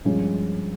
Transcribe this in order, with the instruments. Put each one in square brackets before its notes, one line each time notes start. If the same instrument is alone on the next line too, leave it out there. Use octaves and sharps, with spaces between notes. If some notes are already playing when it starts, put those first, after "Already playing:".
[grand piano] G2 F3 G#3 C#4 F4